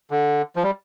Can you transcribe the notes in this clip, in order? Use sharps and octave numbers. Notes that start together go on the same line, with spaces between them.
D3
F3
G3